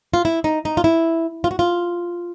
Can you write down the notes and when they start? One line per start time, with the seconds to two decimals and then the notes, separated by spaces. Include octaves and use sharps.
0.14 F4
0.25 E4
0.44 D#4
0.65 D#4
0.77 F4
0.84 E4
1.44 F4
1.51 F#4
1.59 F4